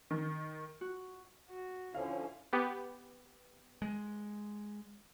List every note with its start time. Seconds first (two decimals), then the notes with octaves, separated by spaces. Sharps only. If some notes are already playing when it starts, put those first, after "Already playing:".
0.11 D#3
0.81 F#4
1.49 F#4
1.95 D3 F3 C#4 E4 F5
2.53 B3 G4
3.82 G#3